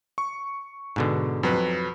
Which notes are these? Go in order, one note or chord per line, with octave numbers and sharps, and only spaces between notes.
C#6
G#2 B2 D3
F2 F#3 B4